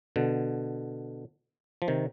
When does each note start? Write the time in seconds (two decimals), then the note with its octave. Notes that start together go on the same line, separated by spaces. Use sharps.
0.16 B2 D3
1.82 F3
1.88 C3 D#3